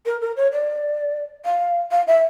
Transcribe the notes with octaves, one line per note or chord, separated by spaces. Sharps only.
A#4
A#4
C#5
D5
F5
F5
E5